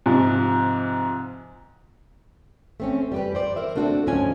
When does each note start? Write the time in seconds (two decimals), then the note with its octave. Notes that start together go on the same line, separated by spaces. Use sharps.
0.06 G#2 C3 F3
2.80 A3 C4 C#4
3.12 G3 G4 B4
3.35 C5 D5
3.56 A#4 C5 E5
3.75 A3 C4 D4 F#4 A4
4.06 D2 G#2 F3 F#3 C#4 G#5